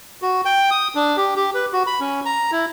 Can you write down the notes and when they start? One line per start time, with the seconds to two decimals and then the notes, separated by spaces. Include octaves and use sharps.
0.22 F#4
0.45 G5
0.71 D#6
0.95 D4
1.17 G4
1.36 G4
1.55 B4
1.73 F#4
1.87 B5
2.00 C#4
2.26 A#5
2.52 E4